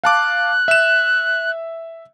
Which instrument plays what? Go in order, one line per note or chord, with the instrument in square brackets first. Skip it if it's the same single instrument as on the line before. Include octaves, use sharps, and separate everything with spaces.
[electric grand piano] F5 A5 D6 [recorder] F#6
[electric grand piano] E5 E7